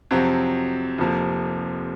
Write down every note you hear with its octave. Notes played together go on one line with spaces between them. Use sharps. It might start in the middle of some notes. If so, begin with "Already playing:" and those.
F2 C3 F#3 C4 F#4
F1 F2 C3 F3 A#3